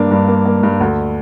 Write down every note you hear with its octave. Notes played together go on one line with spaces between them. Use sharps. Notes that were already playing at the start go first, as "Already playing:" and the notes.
Already playing: G2 A#3 D4
G2
A#3
A#3
G2
D2